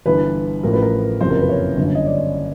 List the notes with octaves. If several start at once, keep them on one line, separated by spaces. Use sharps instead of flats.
G1 G2 E3 B4
A1 A2 F3 A#4
B4
A#4
F#1 F2 C3 E3 C5
A#4
B4
C#5
G1 F#2 D3
D#5
D5